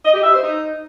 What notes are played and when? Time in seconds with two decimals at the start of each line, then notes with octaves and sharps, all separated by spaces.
0.04 D#5
0.14 G4
0.24 E5
0.33 C5
0.43 D#4